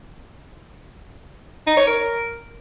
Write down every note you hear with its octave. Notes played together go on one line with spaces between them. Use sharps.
D#4
C#5
A#4